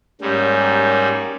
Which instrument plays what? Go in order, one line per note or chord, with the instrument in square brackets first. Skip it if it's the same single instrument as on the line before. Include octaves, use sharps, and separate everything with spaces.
[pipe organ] G#2 G3 [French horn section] A#3 C#4 G4